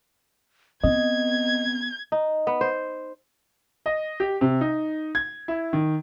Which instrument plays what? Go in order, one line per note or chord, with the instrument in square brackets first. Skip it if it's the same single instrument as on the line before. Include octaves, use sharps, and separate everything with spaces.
[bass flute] B3 [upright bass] C4 [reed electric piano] D#5 [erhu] G#6
[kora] D#4
B3
C5
[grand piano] D#5
G4
C3
D#4
G#6
E4
D#3